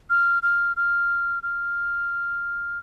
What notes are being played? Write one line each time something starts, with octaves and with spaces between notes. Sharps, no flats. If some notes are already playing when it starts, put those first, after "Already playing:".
F6
F6
F6
F6